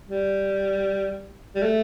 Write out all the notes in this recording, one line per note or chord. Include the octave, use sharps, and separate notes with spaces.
G3
G3
A3